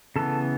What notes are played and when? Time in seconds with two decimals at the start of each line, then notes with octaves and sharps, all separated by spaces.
0.16 C#3 E3 B3 A4